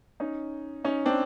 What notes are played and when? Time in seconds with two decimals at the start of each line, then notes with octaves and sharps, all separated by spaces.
0.20 C#4 D#4
0.84 C#4 D#4
1.06 C4 D4